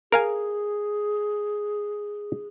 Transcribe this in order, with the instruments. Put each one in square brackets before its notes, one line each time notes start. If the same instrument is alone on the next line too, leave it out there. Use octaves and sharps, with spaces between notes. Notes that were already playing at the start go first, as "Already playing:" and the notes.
[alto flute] G#4 [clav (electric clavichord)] A#4 F5 G#5